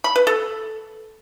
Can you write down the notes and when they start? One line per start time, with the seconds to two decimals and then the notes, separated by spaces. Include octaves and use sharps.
0.04 B5
0.16 B4
0.27 A4